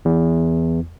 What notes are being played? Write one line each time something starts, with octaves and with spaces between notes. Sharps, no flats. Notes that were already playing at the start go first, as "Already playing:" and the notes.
E2